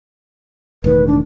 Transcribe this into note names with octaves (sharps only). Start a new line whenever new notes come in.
E1 A2 D#3 B4
D4